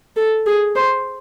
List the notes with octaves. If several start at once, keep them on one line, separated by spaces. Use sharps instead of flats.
A4
G#4
C5